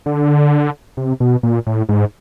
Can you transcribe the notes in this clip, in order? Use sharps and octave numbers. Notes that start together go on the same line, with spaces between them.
D3
C3
B2
A#2
A2
G#2